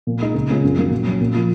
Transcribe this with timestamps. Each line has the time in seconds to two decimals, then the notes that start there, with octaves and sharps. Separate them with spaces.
0.07 A#2
0.20 G#3 D#4
0.35 C#2
0.50 C#3 G#3 C#4 F4
0.64 F#2
0.77 D#3 F#3 A#3 C#4
0.91 A#2
1.07 F#3 C#4
1.20 A#2
1.34 F3 A#3 F4